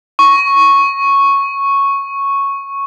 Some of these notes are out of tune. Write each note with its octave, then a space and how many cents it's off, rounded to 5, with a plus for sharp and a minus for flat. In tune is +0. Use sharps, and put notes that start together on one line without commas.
C#6 -5